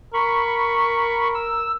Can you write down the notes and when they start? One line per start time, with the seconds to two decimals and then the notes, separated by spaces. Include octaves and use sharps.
0.14 A#4 B5 C#6
1.35 E6